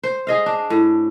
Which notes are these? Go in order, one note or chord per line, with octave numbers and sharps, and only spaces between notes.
C5
G#4 D#5 F5
D4
A2